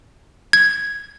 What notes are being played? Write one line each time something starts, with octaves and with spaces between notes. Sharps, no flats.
G#6